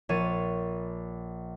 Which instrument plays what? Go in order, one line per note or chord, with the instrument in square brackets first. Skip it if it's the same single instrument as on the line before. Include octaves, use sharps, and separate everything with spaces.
[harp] A#1 C#5 A6 D#7